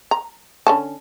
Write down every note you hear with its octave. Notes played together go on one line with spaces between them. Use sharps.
A#5
D3 C#4 A5